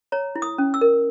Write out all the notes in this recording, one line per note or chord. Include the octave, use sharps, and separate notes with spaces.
C#5 A#5
E4
D#6
C#4
E6
A#4